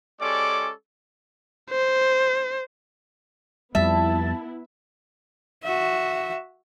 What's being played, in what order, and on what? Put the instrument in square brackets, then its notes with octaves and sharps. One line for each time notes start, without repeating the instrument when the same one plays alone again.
[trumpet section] G#3 C#4 G4 A4 D5 D6
[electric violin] C5
[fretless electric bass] F2 G3 [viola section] B3 E4 [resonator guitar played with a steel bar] E5 [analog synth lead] A5
[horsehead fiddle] F#4 E5